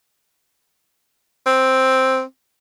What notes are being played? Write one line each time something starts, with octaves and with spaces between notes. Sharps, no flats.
C4